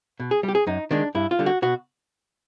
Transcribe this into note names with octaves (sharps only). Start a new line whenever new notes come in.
B2
G#4
G3
G4
G#4
F#2 D#4
D#3 G#3 D4
G2 E4
F4
D3 G3
F#4
B2 F#4